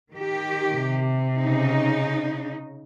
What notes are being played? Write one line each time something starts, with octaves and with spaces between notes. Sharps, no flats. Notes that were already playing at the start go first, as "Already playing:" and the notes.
D#3 G4
C3
C#3 D#4